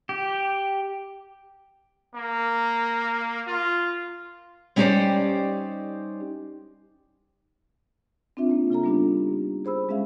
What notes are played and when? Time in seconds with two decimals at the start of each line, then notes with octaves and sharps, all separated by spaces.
0.09 G4
2.14 A#3
3.47 F4
4.76 G3 C#4 D#4 G4 C5 D5
8.37 C4 D4 F4 E5
8.49 A#3 D#4
8.70 C#3 F4 A4 A#5
8.83 G3 B3 D4 D#4 G4
9.65 G#4 C5 B5 E6
9.89 G#3 C#4 G#4 E5 F5